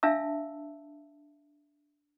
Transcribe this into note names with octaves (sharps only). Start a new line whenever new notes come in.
D4 E5 F5 A5 E6